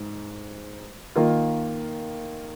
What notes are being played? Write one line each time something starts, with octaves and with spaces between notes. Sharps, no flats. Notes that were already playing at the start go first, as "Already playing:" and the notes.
Already playing: G#2
D#3 A#3 F4